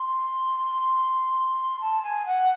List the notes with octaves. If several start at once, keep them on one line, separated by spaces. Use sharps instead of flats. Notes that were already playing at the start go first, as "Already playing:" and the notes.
Already playing: C6
A5
G#5
F#5